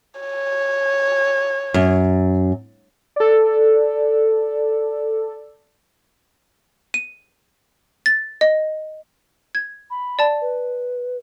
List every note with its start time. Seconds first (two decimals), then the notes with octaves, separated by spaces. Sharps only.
0.21 C#5
1.74 F#2
3.16 A4 D5
6.94 D#7
8.06 A6
8.41 D#5
9.55 G#6
9.91 B5
10.19 D5 A5
10.42 B4